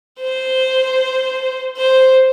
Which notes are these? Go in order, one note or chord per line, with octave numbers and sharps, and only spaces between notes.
C5
C5